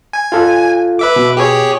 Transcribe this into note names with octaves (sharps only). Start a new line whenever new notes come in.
G#5
F4 A4 F5
B4 E5 D6
B2
G4 G#4 C#5